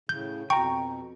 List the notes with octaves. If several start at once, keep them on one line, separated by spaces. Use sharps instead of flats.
A2 C#3 G6
F2 B2 G5 A#5 C#6